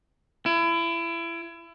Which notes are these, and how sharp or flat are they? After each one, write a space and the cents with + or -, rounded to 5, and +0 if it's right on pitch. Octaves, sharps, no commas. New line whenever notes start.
E4 +30